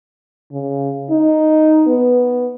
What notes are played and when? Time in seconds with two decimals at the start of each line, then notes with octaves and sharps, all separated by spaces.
0.52 C#3
1.11 D#4
1.87 B3